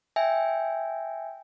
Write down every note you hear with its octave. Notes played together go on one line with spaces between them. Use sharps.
E5 G5 G#5